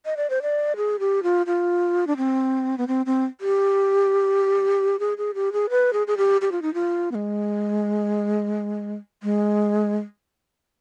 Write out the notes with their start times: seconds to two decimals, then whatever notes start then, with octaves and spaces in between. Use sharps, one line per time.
0.06 D#5
0.17 D5
0.30 C5
0.42 D5
0.76 G#4
0.99 G4
1.23 F4
1.46 F4
2.07 D4
2.17 C4
2.78 B3
2.88 C4
3.06 C4
3.41 G4
4.99 G#4
5.18 G#4
5.35 G4
5.53 G#4
5.70 B4
5.93 G#4
6.07 G#4
6.17 G4
6.41 G4
6.52 F4
6.62 D#4
6.74 F4
7.11 B3
7.15 G#3
9.23 G#3